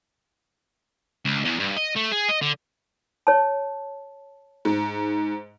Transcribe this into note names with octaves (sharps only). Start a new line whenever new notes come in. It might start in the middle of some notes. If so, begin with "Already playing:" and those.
C#2
E2
G2
D#5
A3
G#4
D#5
D3
C#5 A5
G#2